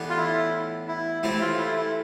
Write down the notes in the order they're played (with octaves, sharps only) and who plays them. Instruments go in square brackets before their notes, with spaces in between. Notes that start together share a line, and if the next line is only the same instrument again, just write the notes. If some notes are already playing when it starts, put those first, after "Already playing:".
Already playing: [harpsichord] A2 E3 B3 D4 G4
[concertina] F4
E4
E4
[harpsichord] A2 E3 A3 C4 G4 [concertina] E4
[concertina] F4
E4
E4